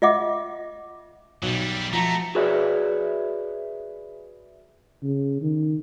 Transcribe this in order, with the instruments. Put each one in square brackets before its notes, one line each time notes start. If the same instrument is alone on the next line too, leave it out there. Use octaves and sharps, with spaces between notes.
[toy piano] F4 D#5 E5 F#5 D6
[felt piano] B1 [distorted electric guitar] F#3 G3
[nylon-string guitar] F3 F#4 [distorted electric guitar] A3 [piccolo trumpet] A#5
[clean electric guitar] F#4 G#4 B4 C#5 D5 E5
[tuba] C#3
D#3